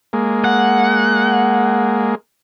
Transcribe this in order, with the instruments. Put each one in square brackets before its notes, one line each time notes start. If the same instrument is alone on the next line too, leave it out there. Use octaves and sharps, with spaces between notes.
[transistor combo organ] G#3 A#3
[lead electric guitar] F#5